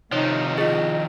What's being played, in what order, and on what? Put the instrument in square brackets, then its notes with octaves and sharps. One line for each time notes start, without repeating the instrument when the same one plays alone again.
[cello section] C3 D#4 [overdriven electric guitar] D#3 F3 [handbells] C#5
[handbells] F4 G#4 [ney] D#5